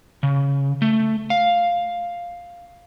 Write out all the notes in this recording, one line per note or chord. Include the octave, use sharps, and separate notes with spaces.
C#3
A3
F5